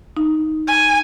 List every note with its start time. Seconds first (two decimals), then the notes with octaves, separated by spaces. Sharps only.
0.17 D#4
0.68 G#5